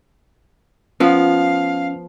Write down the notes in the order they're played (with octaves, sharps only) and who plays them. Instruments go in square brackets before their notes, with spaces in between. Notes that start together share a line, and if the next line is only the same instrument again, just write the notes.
[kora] F3 B3 [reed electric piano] C#4 [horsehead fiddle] F5